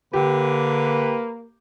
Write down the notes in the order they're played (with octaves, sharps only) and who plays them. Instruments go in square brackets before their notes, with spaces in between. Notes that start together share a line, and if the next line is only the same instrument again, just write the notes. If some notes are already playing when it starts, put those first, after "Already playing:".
[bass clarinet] D3 [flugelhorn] A#3 [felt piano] G4 [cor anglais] B4